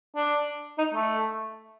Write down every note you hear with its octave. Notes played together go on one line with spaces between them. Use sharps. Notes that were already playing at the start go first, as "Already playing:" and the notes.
D4
D#4
A3